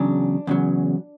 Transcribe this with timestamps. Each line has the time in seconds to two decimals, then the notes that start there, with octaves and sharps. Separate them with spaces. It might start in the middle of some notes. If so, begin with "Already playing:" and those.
Already playing: E2 C#3 F#3 D4
0.47 E2 C#3 F#3